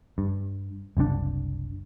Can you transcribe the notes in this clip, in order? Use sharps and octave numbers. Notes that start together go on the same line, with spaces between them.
G2
F#1 C2 A2 D4